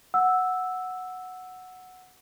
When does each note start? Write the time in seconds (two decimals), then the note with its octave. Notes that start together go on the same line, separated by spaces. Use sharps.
0.14 F#5 E6